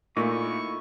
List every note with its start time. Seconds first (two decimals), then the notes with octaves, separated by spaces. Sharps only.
0.17 A#2 A3 A#3 D#4 E4 C#6